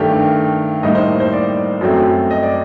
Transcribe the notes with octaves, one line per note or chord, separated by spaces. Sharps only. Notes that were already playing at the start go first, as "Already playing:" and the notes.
Already playing: G2 D#3 A3 D4 G4
A2 G3 A#3 D#4 D#5
C5
C5
D5
F#2 F#3 A3 C4
D#5
D5